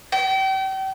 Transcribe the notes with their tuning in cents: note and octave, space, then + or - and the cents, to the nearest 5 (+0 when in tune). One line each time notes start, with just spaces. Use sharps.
G5 -35